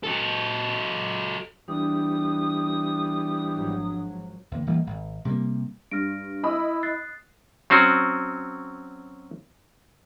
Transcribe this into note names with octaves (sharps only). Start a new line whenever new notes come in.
F#3 A4
E2 G3 D4 D#6
G#1 F3 F#3
E2 D3 A#3
D1 E3 G3 A#3
G#1
C3 G3 G#3 A#3
G2 F6 A#6 D7
E4 D#5 B5 D#6
F#6 A6 C7
F#3 C4 C#4 F#4